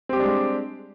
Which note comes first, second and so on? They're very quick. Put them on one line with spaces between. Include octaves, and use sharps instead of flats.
C4 G4 G3 D4 G#3